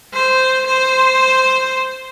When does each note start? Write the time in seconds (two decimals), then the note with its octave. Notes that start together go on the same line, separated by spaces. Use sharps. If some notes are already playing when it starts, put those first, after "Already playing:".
0.14 C5
0.66 C5